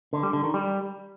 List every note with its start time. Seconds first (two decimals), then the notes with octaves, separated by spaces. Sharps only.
0.13 D3
0.23 G3
0.33 D3
0.44 D#3
0.54 G3